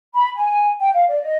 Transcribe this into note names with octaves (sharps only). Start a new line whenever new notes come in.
B5
G#5
G5
F5
D5
D#5